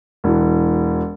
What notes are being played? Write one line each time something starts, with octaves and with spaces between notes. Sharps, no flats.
E1 E3